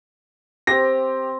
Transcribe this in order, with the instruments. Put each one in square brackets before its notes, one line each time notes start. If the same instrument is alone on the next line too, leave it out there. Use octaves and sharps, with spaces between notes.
[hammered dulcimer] C4 [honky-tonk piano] G4 [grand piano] A#6